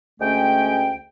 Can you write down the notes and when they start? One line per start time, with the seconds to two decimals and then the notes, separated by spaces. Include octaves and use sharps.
0.20 D2 G#3 A3 C#4 G5